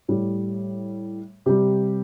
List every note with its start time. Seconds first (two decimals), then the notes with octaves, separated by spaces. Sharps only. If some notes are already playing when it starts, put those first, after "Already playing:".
0.08 A2 G3
1.46 C3 G3 G4